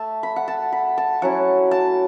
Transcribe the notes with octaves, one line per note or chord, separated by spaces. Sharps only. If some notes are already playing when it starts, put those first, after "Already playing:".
Already playing: A3 E5 A5
B5
F#5
A5
B5
A5
F#3 C#4 E4 F#5
A5